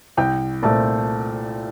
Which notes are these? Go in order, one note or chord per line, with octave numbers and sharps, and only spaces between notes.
C2 G5
A#2 A3 C4 A5